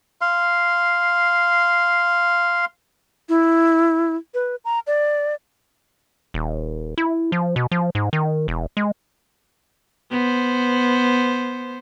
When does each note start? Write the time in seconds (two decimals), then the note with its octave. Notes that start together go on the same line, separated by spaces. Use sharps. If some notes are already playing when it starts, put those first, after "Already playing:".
0.21 F5 C6
3.29 E4
4.34 B4
4.65 A#5
4.87 D5
6.34 D#1
6.98 E4
7.32 F3
7.56 B2
7.71 F3
7.95 G#2
8.13 D#3
8.48 E1
8.77 G#3
10.11 B3 C5